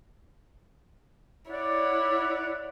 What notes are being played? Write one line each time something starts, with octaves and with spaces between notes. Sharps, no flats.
E4 C#5 D5 F#5